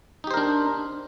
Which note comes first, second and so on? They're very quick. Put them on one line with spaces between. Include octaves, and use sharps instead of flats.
D#4 G4 C5 A#4 D4